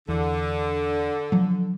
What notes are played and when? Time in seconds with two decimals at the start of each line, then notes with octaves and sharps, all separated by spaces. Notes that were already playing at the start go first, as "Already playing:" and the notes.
0.08 E2 D3
1.32 F3 F#3